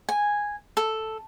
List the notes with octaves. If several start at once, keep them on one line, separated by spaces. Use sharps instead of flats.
G#5
A4